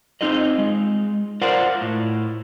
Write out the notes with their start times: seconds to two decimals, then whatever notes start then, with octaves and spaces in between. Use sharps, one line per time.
0.21 C4 D#4 F4 G#4 D#5
0.58 G#3
1.41 F4 A#4 C5 D5 F5 F#5
1.81 A2